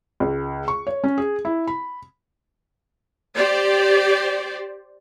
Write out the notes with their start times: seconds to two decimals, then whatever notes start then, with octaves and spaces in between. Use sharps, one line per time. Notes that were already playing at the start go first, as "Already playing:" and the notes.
0.20 C#2
0.68 C#6
0.87 C#5
1.04 C#4
1.18 G#4
1.45 E4
1.67 B5
3.35 G4 C5 D5